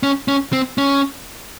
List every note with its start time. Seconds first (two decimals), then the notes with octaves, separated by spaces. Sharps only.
0.03 C#4
0.28 C#4
0.53 C4
0.78 C#4